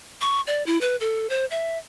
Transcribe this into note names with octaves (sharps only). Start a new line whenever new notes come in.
C#6
D5
E4
B4
A4
C5
E5